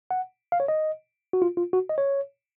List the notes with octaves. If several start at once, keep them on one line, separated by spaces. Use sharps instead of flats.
F#5
F5
C#5
D#5
F#4
F4
F4
F#4
D#5
C#5